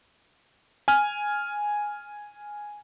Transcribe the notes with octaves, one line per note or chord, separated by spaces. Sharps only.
G#5 F6